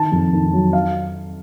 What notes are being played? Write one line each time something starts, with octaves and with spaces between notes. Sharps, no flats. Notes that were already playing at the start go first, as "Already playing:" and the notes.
Already playing: D#3 A5
F2
D#3
F#3
F5